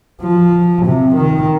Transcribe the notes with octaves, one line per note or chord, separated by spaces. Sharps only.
F3
C3
D#3